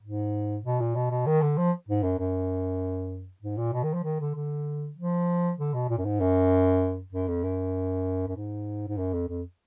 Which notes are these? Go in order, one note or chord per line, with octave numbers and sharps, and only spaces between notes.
G#2
B2
A#2
B2
B2
D#3
D3
F3
G#2
F#2
F#2
G#2
A#2
B2
D#3
F3
D#3
D3
D3
F3
D3
B2
A#2
F#2
G#2
F#2
F#2
F2
F#2
F#2
G#2
G#2
F#2
F2
F2